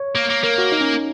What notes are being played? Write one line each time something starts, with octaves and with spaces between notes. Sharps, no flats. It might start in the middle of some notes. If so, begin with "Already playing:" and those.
Already playing: C#5
A#3
A#3
A#3 A#4
F#4
D#4
C#4